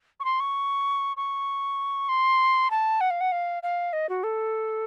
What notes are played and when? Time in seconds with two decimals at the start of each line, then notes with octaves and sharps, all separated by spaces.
0.20 C#6
0.25 C6
0.40 C#6
1.17 C#6
2.09 C6
2.71 A5
3.01 F#5
3.10 F5
3.21 F#5
3.32 F5
3.63 F5
3.93 D#5
4.09 F#4
4.23 A4